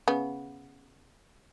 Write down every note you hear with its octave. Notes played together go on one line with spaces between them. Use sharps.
C#3 B3